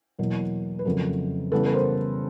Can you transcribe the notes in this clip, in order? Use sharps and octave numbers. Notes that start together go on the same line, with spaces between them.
E2 B2 F#3 A#3
B4
F2 C#3 F#3 A3 C4 A#4
C#3 E3 G3 B3 A4 B4
B4
A#4 C5